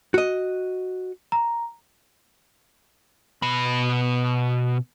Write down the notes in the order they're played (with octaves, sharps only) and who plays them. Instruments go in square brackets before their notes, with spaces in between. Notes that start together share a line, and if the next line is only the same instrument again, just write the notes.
[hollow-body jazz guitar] F#4 D#5
[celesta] A#5
[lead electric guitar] B2 B5